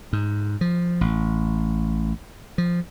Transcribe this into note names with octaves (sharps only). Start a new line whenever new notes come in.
G#2
F3
A1
F3